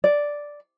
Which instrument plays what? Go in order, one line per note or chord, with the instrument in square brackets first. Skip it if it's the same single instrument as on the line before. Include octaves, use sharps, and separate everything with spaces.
[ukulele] D5